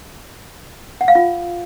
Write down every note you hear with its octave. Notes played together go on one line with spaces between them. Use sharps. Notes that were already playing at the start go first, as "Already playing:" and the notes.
F#5
F5
F4